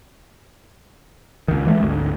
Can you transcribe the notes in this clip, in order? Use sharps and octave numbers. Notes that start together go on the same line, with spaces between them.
C#2 D#3
E3 G#3 A3
G#1 D2